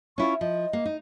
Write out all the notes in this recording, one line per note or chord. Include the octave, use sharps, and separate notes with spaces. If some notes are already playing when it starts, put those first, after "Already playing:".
C#4 E4 F4 C#6
F3 D#5
A#3
D#4